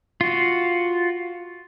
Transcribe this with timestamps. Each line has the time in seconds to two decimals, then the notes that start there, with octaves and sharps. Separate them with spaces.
0.21 F4 F#4